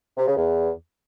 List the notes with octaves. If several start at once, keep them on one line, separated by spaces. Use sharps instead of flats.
C3
C#3
E2